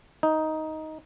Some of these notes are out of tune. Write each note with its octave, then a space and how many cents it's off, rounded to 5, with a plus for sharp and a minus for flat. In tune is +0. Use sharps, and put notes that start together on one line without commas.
D#4 +10